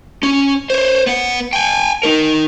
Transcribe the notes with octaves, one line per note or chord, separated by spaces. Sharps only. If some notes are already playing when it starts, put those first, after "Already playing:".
C#4
C5 C#5
B3 F#5
G5 G#5
D#4 A#4